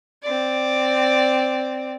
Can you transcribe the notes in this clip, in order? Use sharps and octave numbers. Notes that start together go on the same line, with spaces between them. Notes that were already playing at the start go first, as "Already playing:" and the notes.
C4 D5